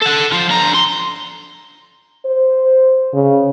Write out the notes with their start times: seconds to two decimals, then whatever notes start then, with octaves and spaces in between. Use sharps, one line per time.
0.02 A4 F#5
0.32 F3 F4
0.50 D3 A#5
0.74 C6
2.25 C5
3.14 C#3